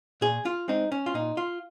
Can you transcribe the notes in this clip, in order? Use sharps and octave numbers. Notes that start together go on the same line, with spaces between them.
A#2 G#4
F4
G#3 C4 D#4
C#4
F4
A#2 D#4
F4